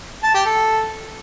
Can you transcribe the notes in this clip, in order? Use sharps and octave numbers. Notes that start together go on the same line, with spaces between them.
A5
G4
A4